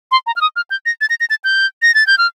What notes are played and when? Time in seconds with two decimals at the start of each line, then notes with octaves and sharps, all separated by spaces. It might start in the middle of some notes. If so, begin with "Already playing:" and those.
0.12 C6
0.27 A#5
0.36 F6
0.41 D#6
0.56 F6
0.71 G6
0.86 A#6
1.01 A6
1.10 A#6
1.20 A#6
1.30 A6
1.44 G6
1.82 A#6
1.95 A6
2.07 G6
2.18 F6